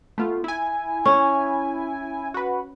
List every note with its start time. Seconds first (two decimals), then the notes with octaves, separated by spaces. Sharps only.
0.18 A3 B3 F4
0.44 E4 G#5
1.05 C#4
2.34 F#4 B4